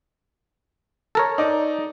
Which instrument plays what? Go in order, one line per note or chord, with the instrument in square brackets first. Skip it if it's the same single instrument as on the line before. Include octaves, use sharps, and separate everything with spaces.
[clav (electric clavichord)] A4 A#4 C#5
[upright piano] D#4 D5